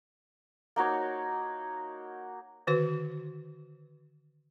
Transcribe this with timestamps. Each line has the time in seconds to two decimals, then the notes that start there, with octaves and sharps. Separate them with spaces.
0.76 A#3 D#4 F#4 C#5
2.67 D3 D#3 F#4 B4